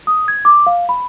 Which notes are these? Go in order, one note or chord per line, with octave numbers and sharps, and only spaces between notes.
D#6
G#6
D6
F5
B5